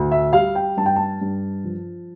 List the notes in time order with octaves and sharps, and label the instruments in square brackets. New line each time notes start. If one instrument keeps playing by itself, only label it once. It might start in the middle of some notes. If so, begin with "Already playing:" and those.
Already playing: [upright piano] D2 A2
E5
G3 F5
G5
G2 A5
G5
A5
G2
F3